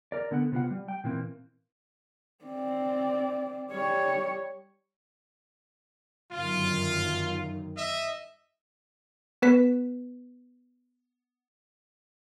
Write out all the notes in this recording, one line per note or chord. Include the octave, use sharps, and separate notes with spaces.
A#4 D5
D3 B3 A4 F#5
C3 B3 F4 F#5
G3
G5
A#2 E3 A#3 C4
C4 D5
G3 C#5
G1 F#2 D#3 F4
D#5 E5
B3 B4 B6